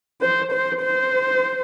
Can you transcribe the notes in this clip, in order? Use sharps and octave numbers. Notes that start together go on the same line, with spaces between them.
C5
C5
C5